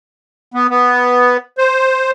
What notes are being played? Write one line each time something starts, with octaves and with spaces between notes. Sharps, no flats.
B3
B3
C5